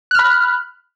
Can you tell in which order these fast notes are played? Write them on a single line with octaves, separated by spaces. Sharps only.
F#6 F6 B5